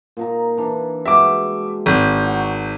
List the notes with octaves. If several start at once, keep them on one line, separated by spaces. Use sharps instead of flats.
A#2 D#4 A#5
E3 D4
B2 G3 G#3 E5 D6
G#1 G#4
D#4 F#4